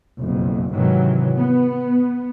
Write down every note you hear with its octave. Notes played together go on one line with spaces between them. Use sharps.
F#1 B1 F2
G#2 C3 D#3 E3 F#3
B3